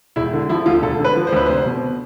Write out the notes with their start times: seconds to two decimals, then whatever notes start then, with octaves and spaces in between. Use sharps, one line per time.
0.16 E1 E4
0.33 D3
0.49 F3 E4
0.66 D2 F4
0.82 E1 A4
1.00 D3 B4
1.16 F3
1.27 C5
1.32 D2 B4
1.46 F1 C5
1.66 B2